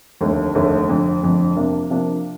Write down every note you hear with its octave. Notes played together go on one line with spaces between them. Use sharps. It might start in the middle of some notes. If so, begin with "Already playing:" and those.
F1 D#2 D3 A3
F1 D#2 D3 A3
F1 F2 D3
F1 F2 D3
C3 F3 A#3 D4 F4
C3 F3 A#3 D4 F4